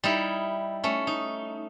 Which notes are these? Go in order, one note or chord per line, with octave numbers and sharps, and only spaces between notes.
G3 D#4 E4
A3 C#4
D#4